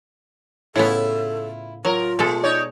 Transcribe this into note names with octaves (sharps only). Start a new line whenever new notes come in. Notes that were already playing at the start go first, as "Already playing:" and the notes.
A2 C#3 B3 E4 F4 A4
F#3 F4 A#4
B2 G#3 A3 A4
D#4 C#5 D5